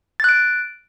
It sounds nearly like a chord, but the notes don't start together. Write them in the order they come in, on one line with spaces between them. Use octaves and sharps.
A6 F#6 D7